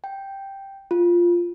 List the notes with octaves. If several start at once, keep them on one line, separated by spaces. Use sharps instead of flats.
G5
F4